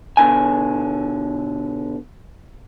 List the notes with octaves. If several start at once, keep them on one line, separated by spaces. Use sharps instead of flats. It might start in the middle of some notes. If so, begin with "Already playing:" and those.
B2 D3 G#5